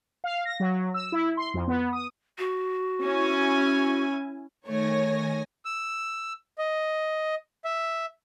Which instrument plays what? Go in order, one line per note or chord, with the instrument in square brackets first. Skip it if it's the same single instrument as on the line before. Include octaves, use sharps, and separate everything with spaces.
[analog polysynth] F5
A#6
F#3
E6
E4
C6
F2
B3
D#6
[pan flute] F#4
[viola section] C#4 E4 G#5
[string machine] D#3 G#5 A#6 [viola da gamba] A3 [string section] C#5
[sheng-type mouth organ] E6
D#5
E5